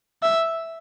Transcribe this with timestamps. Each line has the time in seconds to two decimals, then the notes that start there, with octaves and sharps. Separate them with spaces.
0.23 E5